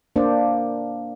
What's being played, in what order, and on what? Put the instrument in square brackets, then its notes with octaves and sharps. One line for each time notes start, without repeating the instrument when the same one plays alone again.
[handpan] A#3 D4 C5 D5